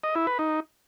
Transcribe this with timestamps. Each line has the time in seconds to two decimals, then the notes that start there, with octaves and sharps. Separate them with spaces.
0.04 D#5
0.15 E4
0.27 B4
0.39 D#4